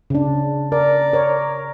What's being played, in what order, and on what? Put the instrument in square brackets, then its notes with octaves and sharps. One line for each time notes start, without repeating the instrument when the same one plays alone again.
[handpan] C#3 D4
[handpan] A#4 [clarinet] D5
[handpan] A#4 C#5